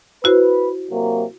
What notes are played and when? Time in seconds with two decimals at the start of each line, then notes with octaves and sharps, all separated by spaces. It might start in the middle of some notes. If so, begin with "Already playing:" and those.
0.24 E4 F#4 B4 C5
0.91 C3 F#3 A#3